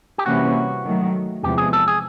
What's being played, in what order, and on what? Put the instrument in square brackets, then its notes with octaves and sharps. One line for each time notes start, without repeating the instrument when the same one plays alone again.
[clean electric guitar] G4
[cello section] C3 E3 G3 A#3 C#4 [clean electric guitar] F#4
[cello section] D#3 F#3 A3
[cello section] E2 C3 F3 G#3 [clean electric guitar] G4
[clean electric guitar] G#4
A4
G#4